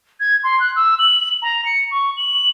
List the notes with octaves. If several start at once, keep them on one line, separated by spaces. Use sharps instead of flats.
G#6
C6
F#6
E6
F#7
A#5
C#7
C#6
F#7